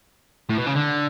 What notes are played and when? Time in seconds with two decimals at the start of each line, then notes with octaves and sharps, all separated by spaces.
0.50 A2
0.58 B2
0.67 C#3
0.76 D3